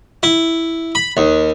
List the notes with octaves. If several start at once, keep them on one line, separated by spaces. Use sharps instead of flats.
E4
B5
D#2